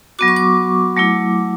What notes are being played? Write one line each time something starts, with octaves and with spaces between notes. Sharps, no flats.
F#3 B3 F#4 D6
C#6
D6
F#3 A3 E4